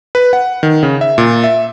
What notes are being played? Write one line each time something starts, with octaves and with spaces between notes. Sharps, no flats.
B4
F#5
D#3
C#3
E5
A#2
E5